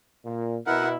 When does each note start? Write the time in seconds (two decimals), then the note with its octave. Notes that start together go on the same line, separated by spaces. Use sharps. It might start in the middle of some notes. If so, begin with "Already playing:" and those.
0.25 A#2
0.66 B2 E4 A#4 F#5